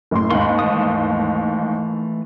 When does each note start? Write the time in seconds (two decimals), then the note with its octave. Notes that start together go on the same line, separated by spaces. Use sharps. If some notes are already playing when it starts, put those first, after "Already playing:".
0.11 F#1 A2 C6
0.31 D#2 G#2 B5 C6
0.59 E3 A3 D#6